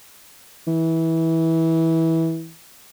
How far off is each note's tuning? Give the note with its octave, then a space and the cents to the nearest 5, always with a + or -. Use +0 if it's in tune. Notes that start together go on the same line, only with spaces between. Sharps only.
E3 -20